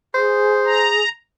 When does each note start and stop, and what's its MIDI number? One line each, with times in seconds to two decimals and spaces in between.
0.14 1.01 68
0.14 0.89 72
0.65 1.09 82